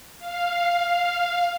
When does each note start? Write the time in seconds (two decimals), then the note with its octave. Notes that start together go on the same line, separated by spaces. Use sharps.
0.19 F5